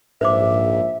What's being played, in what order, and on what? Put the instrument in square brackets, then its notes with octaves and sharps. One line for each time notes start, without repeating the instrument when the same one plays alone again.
[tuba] A#1 [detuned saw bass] G#2 [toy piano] B4 C5 D6 [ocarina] E5